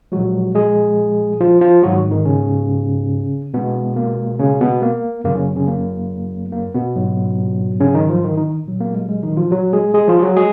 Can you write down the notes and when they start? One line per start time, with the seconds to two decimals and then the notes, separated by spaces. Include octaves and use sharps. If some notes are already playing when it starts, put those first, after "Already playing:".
0.12 A#2 F3 F#3 G#3 F#4
0.55 G#3 G#4
1.41 F3 F4
1.61 F3 F4
1.83 G#2 D#3 F#3 F#4
2.11 D#3 D#4
2.25 C#3 C#4
3.54 B2 G#3 B3
3.96 A#3
4.39 C#3 C#4
4.61 B2 B3
4.82 A#3
5.24 F#2 C#3 F#3 A#3
5.35 C#3 C#4
5.56 C#3 C#4
5.68 A#3
6.52 A#3
6.74 B2 B3
6.96 G#2 F#3
7.80 C#3 C#4
7.95 D#3 D#4
8.09 F3 F4
8.24 D#3 D#4
8.37 D#3 D#4
8.66 A#2 F#3
8.80 A#3
8.94 G#3
9.09 G#3
9.23 D#3 D#4
9.37 F3 F4
9.51 F#3 F#4
9.73 G#3 G#4
9.94 G#3 G#4
10.08 F3 F4
10.19 G#4
10.22 F#3 F#4
10.37 G#3 G#4